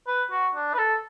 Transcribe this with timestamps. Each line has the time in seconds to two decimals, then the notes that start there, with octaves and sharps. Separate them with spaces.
0.07 B4
0.31 F#4
0.55 D4
0.74 B4
0.78 A4